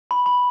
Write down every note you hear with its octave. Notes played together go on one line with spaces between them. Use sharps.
B5
B5